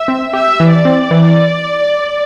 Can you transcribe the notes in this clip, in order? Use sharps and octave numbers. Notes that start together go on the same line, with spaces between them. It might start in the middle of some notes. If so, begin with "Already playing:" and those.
Already playing: E5
C4
G4 E5
E3
D5
C4
E3